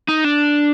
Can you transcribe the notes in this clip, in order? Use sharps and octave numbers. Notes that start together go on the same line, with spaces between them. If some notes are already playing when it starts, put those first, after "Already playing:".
D#4
D4